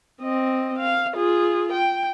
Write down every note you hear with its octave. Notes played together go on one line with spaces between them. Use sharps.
C4 D#5
F5
F4 G#4
G5